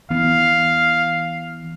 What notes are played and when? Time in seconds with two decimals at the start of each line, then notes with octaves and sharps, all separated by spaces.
0.10 E3 B3 F5